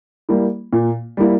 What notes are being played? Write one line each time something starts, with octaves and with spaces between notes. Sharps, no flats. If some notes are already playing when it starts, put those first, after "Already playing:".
G3 A#3 E4
A#2
G3 A#3 E4